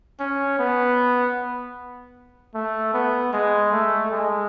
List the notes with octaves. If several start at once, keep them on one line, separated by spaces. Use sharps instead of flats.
C#4
B3
A3
B3
G#3
A3
G#3